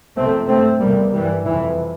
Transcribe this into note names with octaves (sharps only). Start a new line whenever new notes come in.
F2 C3 A3 C4
G2 A3 C4
E2 C3 G3 A#3
G2 E3 G3
F2 C3 E3